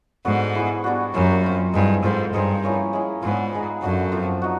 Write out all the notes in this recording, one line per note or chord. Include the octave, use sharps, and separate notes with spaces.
G#2 B3 D4 F#4 A4
B3 E4 G#4
G3 B3 D4 F#4
F#2 G3 A#3 C#4 F4
G3 C4 F4
G2 G#3 C4 E4
G#2 C4 F4 A4 C5
G2 D#4 G#4 C5
F3 A#3 C#4 E4
G#3 C#4 E4 G#4
G#2 B3 D4 F4
D#4 G#4 B4
F#2 A3 D4 F#4
F3 A3 C4
D#4 F#4